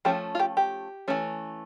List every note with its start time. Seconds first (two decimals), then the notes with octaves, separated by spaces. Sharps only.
0.05 F3 A3 C#4 G4
0.35 F4
0.40 G4
0.57 G4
1.08 E3 A3 C#4